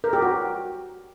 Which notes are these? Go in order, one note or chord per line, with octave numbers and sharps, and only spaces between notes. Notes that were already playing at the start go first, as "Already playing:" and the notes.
A#4
G4
F#4